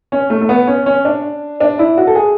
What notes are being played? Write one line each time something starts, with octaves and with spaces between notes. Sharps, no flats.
C#4
A3
A3
B3
C#4
C#4
D4
D4
E4
F#4
A4
G#4